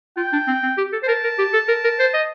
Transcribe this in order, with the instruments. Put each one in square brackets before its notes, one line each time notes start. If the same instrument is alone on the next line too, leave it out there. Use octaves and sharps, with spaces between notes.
[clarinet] F4 [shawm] G5
[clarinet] D4
C4
C4
G4
A4
C5
[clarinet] A#4 [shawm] A5
[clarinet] A#4
G4
A4
A#4
A#4
C5
D#5